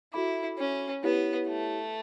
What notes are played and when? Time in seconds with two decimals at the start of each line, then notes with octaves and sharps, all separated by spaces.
0.13 E4 F#4 A4 E5 B5 D6
0.58 C#4
1.03 B3 E4 G4 C#5
1.48 A3